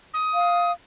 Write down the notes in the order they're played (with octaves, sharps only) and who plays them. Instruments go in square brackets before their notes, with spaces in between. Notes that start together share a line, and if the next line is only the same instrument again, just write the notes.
[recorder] D#6
[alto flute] F5